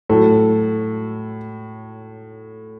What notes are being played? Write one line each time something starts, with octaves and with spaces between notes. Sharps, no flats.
A2 F#3 A4